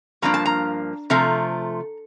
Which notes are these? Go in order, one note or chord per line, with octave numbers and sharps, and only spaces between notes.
G2 F3 A#3 D4 A#5
A5
A#5
C3 F3 A3 A#5